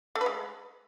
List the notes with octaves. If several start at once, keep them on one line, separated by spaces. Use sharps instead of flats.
A3
B4
G#3